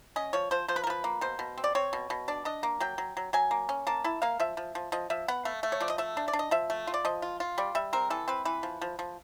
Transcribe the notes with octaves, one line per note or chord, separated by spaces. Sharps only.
C#4 D#5
F3 C#5
F3 C5
F3 C5
B4
A#4
F3 B4
A#3
B2 C5
B2
C4
D5
C4 C#5
B2
B2
D4 D5
D4 D#5
A#3
F#3 G5
F#3
F#3
F#3 G#5
A#3
C#4
A#3 A5
E4 A5
A#3 F5
F3 E5
F3
F3
F3 D#5
F3 E5
B3 F#5
A3 F5
A3
C#5
F3 D5
D#5
A3 E5
D4
D5
D4
D#5
F3 E5
A3
F4
D5
F3 D#5
F4
F4
G3 D5
G3 E5
C4 A#4
E3 A4
C4 B4
E3 B4
F3
F3
F3